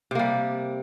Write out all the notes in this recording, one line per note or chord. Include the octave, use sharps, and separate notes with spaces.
C3 G3 A#3